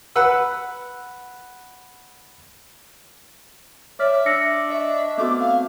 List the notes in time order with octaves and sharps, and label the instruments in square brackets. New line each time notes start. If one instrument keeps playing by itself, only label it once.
[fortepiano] B4 F#5 E6
[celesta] C#5 F6 B6 [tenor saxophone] D5 [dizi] E5
[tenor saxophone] D4 [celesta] E6 A#6 C#7
[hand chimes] D#5 C#6 [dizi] E5
[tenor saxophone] A3 [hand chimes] B3 C4 F#4 [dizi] D6
[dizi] F5